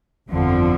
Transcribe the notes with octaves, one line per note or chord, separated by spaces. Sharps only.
G1 F2 D3 F3